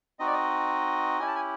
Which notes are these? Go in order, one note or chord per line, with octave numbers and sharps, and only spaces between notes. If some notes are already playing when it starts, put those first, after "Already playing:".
C4 D#4 F#4 D#5
D5
D#5
C#4 E4 G4 G#5
A5
G#5